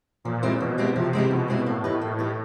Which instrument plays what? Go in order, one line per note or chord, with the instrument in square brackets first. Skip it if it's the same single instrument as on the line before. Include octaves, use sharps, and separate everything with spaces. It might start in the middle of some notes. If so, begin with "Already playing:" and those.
[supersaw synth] A#2 [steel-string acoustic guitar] F3
[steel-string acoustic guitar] G#3 C4 E4 G4
[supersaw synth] B2 [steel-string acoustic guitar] F3
[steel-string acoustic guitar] G#3 C4 E4 G4
[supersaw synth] C3 [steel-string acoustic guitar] F3
[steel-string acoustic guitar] G#3 C4 E4 G4
[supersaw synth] B2 [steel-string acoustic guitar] F3
[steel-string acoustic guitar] G#3 C4 E4 G4
[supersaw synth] A2 [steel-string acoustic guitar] A#3
[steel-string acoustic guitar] D#4 G4 B4
[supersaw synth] A2 [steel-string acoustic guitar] A#3
[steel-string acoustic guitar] D#4 G4 B4